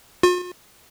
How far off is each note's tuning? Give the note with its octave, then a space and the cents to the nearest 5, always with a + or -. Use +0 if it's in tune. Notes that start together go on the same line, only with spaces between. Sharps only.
F4 +45